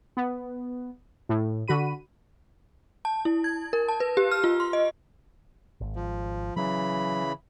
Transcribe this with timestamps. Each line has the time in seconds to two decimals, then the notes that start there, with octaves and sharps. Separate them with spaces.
0.17 B3
1.29 A2
1.68 D3 F#4 B5 D#7
3.05 A5
3.25 E4
3.44 G#6
3.73 A#4
3.88 A5
4.00 B4
4.17 G4
4.31 F6
4.44 F4
4.60 C6
4.73 D#5
5.81 G#1
5.96 F3
6.57 C#3 E3 F#3 B5